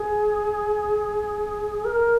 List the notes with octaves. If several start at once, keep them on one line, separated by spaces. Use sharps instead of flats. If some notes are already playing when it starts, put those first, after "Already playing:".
Already playing: G#4
A#4